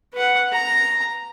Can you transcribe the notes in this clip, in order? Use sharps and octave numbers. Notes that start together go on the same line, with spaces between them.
B4 F#5
A#5